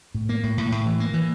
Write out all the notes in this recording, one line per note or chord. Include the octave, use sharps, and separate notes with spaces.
A2
A#3
A2
A2
A2
E3
A#3
E3